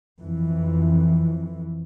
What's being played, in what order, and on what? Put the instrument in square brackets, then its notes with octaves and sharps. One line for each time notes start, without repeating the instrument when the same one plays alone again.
[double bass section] F2 E3